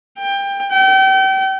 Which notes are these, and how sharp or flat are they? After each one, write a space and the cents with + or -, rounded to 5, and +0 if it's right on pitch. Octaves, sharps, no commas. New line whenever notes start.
G5 +20
G5 -35